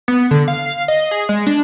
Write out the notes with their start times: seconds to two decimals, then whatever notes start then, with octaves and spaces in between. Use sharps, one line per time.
0.08 B3
0.31 D3
0.48 F5
0.66 F5
0.88 D#5
1.11 G#4
1.29 G#3
1.46 D4